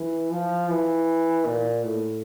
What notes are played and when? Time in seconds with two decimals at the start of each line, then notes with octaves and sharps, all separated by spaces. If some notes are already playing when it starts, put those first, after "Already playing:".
Already playing: E3
0.32 F3
0.70 E3
1.46 A#2
1.83 A2